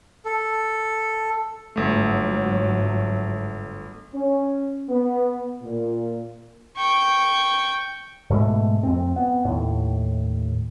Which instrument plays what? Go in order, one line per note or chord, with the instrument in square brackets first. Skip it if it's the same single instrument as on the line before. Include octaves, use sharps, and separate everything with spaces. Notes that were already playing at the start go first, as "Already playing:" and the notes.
[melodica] A4
[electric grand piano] G1 A3 [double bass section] G#2 F#3
[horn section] C#4
B3
A#2
[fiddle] G5 C#6
[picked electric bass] G#2 B2 G#3 A3
F2 C4
B3
D#2 A2